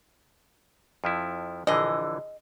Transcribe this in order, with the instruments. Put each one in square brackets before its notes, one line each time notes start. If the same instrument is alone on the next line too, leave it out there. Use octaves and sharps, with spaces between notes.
[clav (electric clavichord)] F2 F3 E4
[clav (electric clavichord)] A#1 D3 E3 [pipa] G#4 D#5